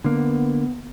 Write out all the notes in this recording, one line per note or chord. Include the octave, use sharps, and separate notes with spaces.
D3 A#3 B3